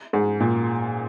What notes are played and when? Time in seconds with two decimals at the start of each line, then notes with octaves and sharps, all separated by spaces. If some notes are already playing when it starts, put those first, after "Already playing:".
0.13 G#2
0.40 A#2